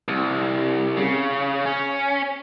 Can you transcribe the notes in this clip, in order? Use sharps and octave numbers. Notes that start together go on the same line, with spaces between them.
C2
C#3
C#4